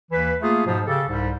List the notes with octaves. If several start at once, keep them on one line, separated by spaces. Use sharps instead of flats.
D#2 E3 B4
A3 A#3 F4 G#4
G#2 B2 F3
C#3 G4 A4
C2 G#2 G3